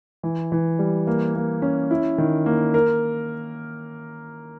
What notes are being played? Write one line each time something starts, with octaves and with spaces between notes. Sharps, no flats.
E3
E3
G3
A#3
A#3
C#4
E4
D#3
A#3
A#4